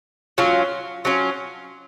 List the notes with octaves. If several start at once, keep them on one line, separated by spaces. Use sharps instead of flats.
F#3 C#4 F4
F#3 C#4 F4